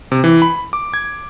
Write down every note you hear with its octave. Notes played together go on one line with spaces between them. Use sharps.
C3
E3
B5
D6
G#6